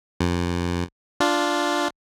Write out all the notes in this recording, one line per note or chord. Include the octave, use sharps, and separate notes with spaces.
F2
D4 F4